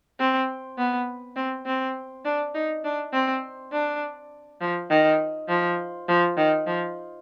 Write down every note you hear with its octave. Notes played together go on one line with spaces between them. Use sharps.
C4
B3
C4
C4
D4
D#4
D4
C4
D4
F3
D#3
F3
F3
D#3
F3